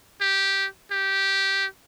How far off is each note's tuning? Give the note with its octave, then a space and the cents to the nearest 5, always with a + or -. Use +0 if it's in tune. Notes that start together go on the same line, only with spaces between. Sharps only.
G4 -5
G4 -10